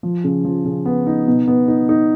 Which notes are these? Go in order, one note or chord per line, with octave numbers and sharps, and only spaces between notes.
F3
C#3
F3
C#3
B3
D#4
B2
B3
D#4
D#4